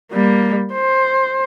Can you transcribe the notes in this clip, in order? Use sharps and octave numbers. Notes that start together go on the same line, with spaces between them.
G3 A#3
C5